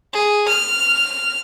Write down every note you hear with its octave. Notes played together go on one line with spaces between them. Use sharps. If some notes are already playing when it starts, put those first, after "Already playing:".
G#4
F6